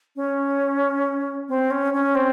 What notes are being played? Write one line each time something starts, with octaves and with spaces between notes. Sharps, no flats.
C#4
C4
C#4
C#4
C4